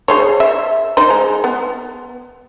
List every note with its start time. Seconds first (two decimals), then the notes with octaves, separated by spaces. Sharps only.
0.08 G#4 C5 C#5
0.40 E5
0.97 D#4 C5
1.10 G#3
1.44 B3